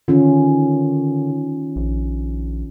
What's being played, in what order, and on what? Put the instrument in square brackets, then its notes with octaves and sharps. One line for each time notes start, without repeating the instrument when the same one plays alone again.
[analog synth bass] D3 [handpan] D#3 C#4 F4
[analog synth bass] A#1